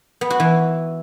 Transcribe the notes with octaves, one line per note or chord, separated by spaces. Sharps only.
B3
F#4
E3